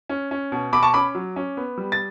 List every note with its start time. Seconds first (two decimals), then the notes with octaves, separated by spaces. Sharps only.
0.09 C#4
0.31 C#4
0.52 B2
0.72 B2 B5 D6
0.83 A5 C#6
0.94 C#4 B5 D6
1.15 F#3
1.36 C#4
1.57 B3
1.78 G3
1.92 A6